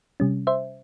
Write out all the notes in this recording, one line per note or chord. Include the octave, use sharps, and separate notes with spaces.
C3 G3 C#4
C5 E5